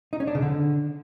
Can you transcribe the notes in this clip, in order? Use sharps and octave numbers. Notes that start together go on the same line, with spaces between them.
D#4
C#4
D4
C#3
D3